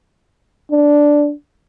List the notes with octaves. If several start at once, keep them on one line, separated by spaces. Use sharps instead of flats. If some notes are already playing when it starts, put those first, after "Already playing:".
D4